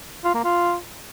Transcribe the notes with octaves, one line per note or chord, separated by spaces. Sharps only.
F4
A#3
F4